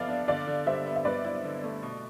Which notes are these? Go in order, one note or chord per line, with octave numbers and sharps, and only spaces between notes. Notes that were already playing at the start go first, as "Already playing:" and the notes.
Already playing: F3 B3 A4 D5 E5 F5
D4
D3 D5 F5
D3
G3 C5 E5
B3
E5
G2 B4 D5
E4
D3
A3
B2